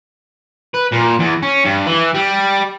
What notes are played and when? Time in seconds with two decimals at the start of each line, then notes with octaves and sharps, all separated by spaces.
0.75 B4
0.93 A#2
1.20 E2
1.43 C#4
1.64 G2
1.86 E3
2.14 G3